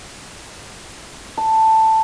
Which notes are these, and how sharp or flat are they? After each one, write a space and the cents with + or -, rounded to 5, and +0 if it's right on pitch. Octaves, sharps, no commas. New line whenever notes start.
A5 +10